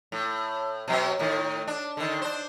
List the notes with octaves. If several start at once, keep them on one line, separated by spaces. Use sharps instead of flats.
A2
B2 F#3 C#4
A2 D#3
D4
D3 D#3
D4 C5